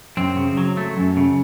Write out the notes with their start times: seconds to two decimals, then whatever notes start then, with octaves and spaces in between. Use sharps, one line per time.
0.17 F#2 C4
0.37 C#3
0.57 F#3
0.77 A3
0.97 F#2
1.17 C#3